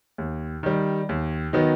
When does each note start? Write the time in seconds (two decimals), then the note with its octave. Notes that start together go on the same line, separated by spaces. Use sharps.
0.18 D#2
0.63 D#3 G3
1.09 D#2
1.53 D#3 F#3 B3 D#4